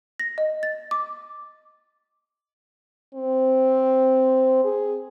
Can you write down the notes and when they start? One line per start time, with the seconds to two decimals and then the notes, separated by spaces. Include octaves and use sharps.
0.20 A#6
0.38 D#5
0.63 A6
0.91 D6
3.14 C4
4.64 G#4